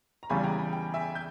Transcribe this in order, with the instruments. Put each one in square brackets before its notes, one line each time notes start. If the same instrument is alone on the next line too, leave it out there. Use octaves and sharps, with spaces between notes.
[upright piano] A#5
[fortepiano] E2 C#3 G3 [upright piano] G#5 B5
[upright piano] G5 A#5
G5
G5
E5 G#5
G6